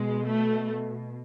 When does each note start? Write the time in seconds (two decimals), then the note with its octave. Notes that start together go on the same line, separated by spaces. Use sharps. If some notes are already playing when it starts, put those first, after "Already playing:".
Already playing: B2 G#3
0.28 A3